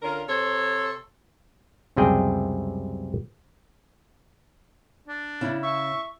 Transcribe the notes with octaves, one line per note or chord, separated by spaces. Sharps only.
D3 C#4 F4 A#4
C3 A4 C5 C#5
C#2 F#2 C3 G3 G#4 G5
D4
C#3 C#4 E4
E5 C#6